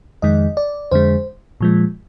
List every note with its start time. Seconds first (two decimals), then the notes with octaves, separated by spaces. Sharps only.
0.22 F2 D#3 G#3 D#5
0.57 D5
0.91 F2 D3 G#3 C5
1.61 A#2 F3 G#3